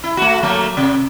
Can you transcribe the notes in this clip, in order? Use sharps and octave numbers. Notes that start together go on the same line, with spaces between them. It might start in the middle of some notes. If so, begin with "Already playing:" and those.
E4
A3 F#4
F#3 A3 A#3
C3